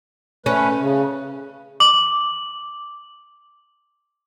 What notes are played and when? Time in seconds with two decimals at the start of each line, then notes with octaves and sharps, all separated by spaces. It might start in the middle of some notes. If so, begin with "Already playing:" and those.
0.46 A3 C#4 B4
0.81 C#3
1.80 D6 F#7